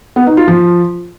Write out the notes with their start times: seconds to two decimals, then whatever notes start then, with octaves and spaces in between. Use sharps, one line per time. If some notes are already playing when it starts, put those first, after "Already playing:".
0.16 B3
0.27 D#4
0.37 F4
0.48 F3